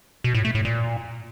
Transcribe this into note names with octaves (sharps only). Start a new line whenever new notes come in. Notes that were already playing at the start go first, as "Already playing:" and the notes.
B2
A2
A3
A2
A#2